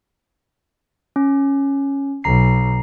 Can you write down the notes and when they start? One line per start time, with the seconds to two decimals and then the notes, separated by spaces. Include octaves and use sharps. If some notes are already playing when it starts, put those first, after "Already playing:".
1.16 C#4
2.24 B1 A#5 C7